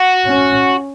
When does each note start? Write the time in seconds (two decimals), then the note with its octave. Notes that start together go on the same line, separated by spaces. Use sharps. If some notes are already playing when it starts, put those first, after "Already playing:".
Already playing: F#4
0.27 C#4